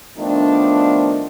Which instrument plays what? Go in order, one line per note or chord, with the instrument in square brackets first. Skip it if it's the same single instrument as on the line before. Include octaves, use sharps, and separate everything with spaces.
[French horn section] D#3 F3 A3 B3 D4